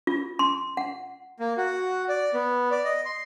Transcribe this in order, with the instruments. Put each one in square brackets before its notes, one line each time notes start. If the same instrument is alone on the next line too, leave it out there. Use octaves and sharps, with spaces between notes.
[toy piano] F4
C6
F#5
[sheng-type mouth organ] A#3
F#4
D5
B3
D5
D#5
C6